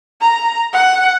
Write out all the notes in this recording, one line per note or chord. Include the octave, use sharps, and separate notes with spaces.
A#5
F#5